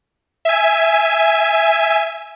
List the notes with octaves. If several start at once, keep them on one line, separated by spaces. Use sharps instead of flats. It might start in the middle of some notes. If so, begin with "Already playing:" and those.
E5 G#5